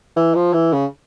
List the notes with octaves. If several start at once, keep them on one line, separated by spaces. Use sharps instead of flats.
E3
F3
E3
C#3